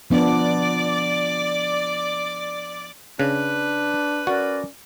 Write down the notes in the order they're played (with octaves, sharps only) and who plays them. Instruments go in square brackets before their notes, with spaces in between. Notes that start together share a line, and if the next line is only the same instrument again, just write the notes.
[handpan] F3 B3 D4 [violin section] D5
[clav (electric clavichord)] C#3 [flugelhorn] D4 [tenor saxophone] B4
[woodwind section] C#4 A#4 D5 [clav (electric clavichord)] F#4